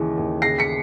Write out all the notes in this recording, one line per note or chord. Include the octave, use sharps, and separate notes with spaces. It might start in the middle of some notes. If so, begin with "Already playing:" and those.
Already playing: D#2 C#3 E3
D#2
C#3 A#6 C7
B6 C#7